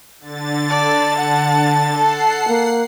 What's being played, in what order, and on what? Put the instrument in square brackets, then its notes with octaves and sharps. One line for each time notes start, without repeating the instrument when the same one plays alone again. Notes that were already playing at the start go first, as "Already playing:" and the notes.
[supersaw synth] D3 A6
[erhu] D5 [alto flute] A5
[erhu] F#5
[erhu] A4 [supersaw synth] F#5 C7
[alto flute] A#3